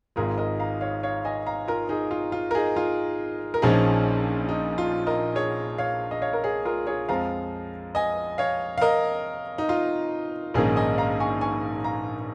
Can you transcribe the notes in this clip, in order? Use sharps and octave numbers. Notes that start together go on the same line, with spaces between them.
G#1 G#2 G#3 F4 A#4
A#4 D#5
F5 A#5
C#5 F5
C#5 F5
D#5 G#5
F5 A#5
F4 A#4
D#4 G#4
F4
F4
A#4
D#4 G#4
F4
A#4
A#1 A#2 F3 C#4 D#4 G#4
D#4
F4
A#4 D#5
G#4 C#5
C#5 F5
D#5
C#5 F5
A#4
G#4 C#5
F4 A#4
G#4 C#5
F2 F3 G#3 F5 A#5
D#5 G#5
C#5 F5
F5
A#4 D#5
D#4
F4
A#1 G#2 D#3 A#3 C#4 D#4 G#4
D#5 G#5
F5 A#5
G#5 C#6
G#5 C#6
F5 A#5